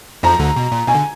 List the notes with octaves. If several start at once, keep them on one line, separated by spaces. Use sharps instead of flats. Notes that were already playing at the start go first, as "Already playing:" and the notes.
F2 F3 A#5
D2 D3
B2
A#2
B2 G#5
D3